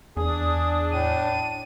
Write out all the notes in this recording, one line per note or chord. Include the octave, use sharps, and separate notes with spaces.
E2 D4 G#4 D#6
A2 D#7